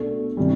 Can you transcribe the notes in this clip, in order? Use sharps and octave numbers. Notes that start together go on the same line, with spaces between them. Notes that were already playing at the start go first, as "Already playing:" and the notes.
Already playing: B2 A3 D4 A4
C3 E3 G3